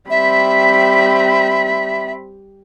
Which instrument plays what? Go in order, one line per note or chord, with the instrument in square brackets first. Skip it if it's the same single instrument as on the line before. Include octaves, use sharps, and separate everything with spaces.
[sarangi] G3 [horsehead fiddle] C4 B5 [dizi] E5